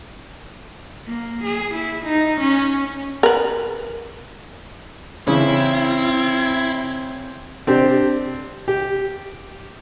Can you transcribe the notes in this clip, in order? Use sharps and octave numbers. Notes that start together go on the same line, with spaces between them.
A#3
G#4
E4
D#4
C#4
A#4 B4
C#3 E3 C4 E4
C4 D4 G4
G4